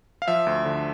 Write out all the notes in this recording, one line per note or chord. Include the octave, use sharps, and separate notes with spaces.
F5
F3 E5
D2
D3